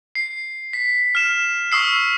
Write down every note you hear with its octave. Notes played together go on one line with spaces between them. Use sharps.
C7
B6
F6 E7
C#6 D#6 E6 C7